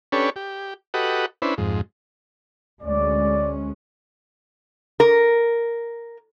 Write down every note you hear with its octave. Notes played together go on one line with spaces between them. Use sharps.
C#4 D4 G4 A4 B4 C#5
G4
F#4 G4 A4 B4 D#5 F#5
C#4 D4 E4 B4 C5
F2 G#2
D2 G#3 C#4 D5
A#4